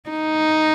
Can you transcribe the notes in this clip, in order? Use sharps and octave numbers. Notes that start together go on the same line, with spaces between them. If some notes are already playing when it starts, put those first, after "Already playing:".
D#4